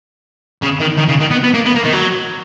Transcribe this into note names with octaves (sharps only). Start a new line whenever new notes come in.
C#3
D#3
D#3
C#3
D#3
B3
B3
A#3
B3
A#3
D#3
F#3